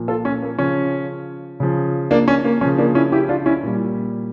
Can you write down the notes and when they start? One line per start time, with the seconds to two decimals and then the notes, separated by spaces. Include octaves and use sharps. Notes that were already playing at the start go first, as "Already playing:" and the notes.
Already playing: A#2 F3
0.08 F4 A4
0.25 C#4
0.42 A#3
0.59 C#3 F3 C#4
1.60 C#3 F3
2.11 A#3 D4
2.28 C#4
2.45 A#3
2.61 C#3 F3 C#4
2.78 A#3 D4
2.95 C#4 E4
3.12 E4 G4
3.29 D4 F4
3.46 C#4 E4
3.63 A#2 G3